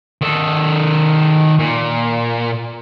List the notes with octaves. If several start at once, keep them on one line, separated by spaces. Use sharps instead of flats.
D#3 A4
A#2